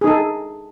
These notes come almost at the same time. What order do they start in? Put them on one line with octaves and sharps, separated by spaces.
G#4 D#4 A4